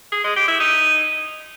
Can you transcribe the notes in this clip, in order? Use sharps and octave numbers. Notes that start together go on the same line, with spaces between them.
G#4
G#3
G4
E4
D#4